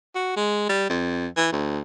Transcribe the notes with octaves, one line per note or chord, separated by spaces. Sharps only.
F#4
G#3
G3
F2
E3
D2